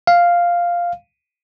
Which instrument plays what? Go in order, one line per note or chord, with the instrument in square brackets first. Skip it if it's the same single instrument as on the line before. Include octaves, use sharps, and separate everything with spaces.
[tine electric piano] F5